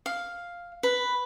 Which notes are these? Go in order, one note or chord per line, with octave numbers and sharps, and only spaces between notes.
F5
B4